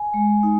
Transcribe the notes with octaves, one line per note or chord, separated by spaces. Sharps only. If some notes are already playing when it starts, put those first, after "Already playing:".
Already playing: G#5
G#3
D#4